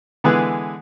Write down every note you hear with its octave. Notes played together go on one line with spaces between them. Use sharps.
D3 E3 G#3 B3 G#4 B4